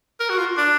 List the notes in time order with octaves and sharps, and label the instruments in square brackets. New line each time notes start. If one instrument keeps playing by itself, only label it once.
[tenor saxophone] A#4
F#4
F4
D4